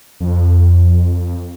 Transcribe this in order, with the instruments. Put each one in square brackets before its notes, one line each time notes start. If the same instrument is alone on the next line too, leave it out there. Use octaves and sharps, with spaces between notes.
[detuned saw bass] F2